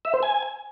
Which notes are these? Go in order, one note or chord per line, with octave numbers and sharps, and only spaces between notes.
E5
C5
G#5